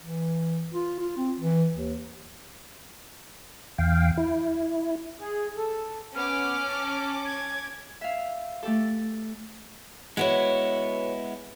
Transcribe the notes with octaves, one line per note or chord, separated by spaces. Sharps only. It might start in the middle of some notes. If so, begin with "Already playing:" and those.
E3
F4
F4
C4
E3
D#2
E2 F5 G5
E4
G#4
A4
B3 C#4 B4 D6 F6
A5
G#6
E5 F5
A3 G4 A4
G#3 B3 E4 F#4 B4 C#5